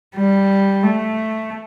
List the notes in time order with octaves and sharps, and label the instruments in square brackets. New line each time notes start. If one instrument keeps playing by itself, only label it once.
[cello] G3
A3